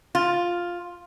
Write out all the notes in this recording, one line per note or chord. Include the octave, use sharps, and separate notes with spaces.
F4